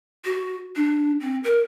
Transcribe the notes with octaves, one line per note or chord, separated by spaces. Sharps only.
F#4
D4
C4
A#4